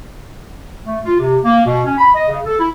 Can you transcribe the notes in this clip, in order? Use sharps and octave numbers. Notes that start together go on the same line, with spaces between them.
A3
F4
C3
A#3
B2
C#4
B5
D#5
C#3
A4
E4